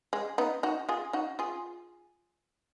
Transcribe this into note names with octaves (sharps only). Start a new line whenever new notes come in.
G#3
B3 D#4
D#4 F#4
F4 G#4
D#4 F#4
F4 G#4